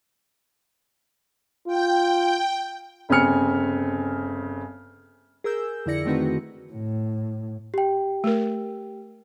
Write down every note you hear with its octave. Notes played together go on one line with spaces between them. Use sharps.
F4 G5
G1 C#3 C4 G#5 F6 C#7
G#4 A#4 E6 G6
F2 D3 E4 D5 A#6 C#7
D#3 A3 C4 D#4 F#4 B4
A2
G4 G5
A3 A#4